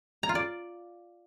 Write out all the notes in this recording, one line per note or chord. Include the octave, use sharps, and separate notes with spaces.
A#5
F4
D5